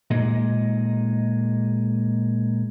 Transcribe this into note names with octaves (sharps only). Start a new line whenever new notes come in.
A#2 G#3 D#4